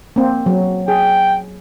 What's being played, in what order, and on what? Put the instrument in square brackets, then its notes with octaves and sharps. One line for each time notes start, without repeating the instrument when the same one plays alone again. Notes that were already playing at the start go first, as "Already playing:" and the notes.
[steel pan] A#3 C4
F#3
[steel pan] G#4 [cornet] G5